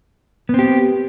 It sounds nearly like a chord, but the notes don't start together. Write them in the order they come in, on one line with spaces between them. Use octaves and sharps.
B3 C4 G4